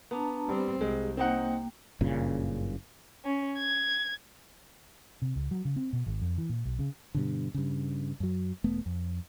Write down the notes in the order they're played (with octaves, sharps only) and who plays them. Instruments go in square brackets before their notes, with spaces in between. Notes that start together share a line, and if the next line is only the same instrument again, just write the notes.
[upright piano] B3 [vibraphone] D4 A5 A#5
[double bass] G3 C4
[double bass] C2 [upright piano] G#3 [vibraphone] G4
[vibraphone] A#3 G5 [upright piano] C4 D#4 F#5
[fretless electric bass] F#1 G2 A#2 C#3
[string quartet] C#4
G#6
[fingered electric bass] C3
C#2
F#3
C#3
C4
B2
G#1
F2
E3
A#2
B1
C#3
G2 B2 D3
G2 C#3
F#2 F#3
E1 A3 B3
F2